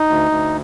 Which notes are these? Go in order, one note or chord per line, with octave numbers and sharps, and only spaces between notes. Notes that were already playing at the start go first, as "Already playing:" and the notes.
Already playing: D#4
D2
D2